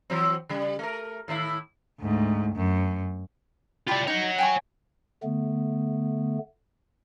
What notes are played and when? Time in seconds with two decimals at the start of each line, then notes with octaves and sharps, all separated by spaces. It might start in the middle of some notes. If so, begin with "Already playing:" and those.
0.10 E3 F#3 C4
0.49 C#3 G3
0.79 A3 A#4
1.28 A2 D#3 E4
2.01 D2 G#2
2.56 F#2
3.88 E4 F4 G4 D5 A5
4.08 D#4 C#5 F#5
4.38 G5 G#5 C#6
5.23 D3 A3 B3